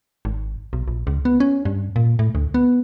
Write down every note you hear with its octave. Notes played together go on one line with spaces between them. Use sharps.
G#1
B1
A#1
C#2
B3
C#4
G2
A#2
A2
D2
B3